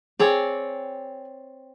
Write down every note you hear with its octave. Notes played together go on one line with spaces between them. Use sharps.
C4 G#4 C#5 D5